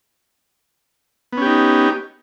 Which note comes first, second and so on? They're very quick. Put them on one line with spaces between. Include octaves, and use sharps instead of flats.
B3 C#4 G4 D#4